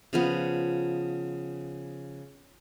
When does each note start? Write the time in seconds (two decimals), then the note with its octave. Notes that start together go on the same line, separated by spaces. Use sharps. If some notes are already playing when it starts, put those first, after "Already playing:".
0.13 C#3 F3 B3